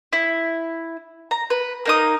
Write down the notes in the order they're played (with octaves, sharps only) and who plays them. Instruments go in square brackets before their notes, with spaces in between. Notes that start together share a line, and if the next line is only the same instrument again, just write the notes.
[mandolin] E4
A#5
B4
A#3 D#4 D#6